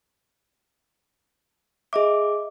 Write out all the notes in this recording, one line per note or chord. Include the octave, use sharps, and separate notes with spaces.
G#4 D#5 E5 D6